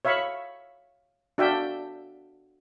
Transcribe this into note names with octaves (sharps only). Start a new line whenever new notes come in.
C#5 E5 F5 B5 C#6
D4 F#4 E5 F5 G5